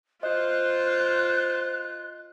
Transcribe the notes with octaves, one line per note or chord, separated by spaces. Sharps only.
F4 C5 D#5 F#6